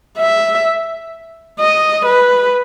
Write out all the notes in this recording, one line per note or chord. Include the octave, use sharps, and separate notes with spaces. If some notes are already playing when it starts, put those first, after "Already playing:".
E5
D#5
B4